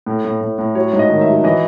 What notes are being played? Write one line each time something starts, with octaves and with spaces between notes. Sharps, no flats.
A2 A4
A2
A2
A2
F#3 C#5
G#2
D#5
D#3
E5
F#3
E3 D#5